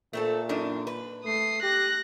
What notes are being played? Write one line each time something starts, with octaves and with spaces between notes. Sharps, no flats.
A#2 A3 C4 A4
F#2 D4 D#4
B4
A3 D#6 C7
G4 F#6 A#6